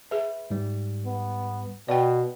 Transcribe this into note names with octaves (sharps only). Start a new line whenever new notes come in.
G#4 B4 E5
G#2 G3
B3
B2 D5 G5